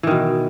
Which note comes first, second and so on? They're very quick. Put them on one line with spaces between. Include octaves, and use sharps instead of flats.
E3 D#3 B2